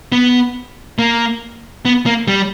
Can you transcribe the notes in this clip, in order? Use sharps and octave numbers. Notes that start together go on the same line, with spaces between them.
B3
A#3
B3
A#3
G3